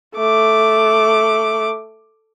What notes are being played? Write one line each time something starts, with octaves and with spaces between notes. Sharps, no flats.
A3 D6